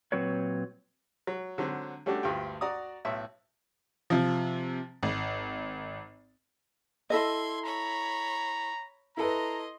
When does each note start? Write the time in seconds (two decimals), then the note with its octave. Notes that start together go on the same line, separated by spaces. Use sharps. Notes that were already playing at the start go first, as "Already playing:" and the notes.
0.12 A#2 F#3 C4 F#4 B4 C#5
1.27 F#3
1.58 D3 F#3 C4
2.06 G3 A3 C#4 D4 F#4 G4
2.23 D2 G2 F4 G5
2.61 F#4 D5 A#5 D#6
3.05 B1 A2 E5
4.10 C3 F3
5.03 G#1
7.10 E4 A4 D#5 C6 G#6
7.65 C#5 A#5 B5
9.17 E4 A4 B4 D#5 A#5 C6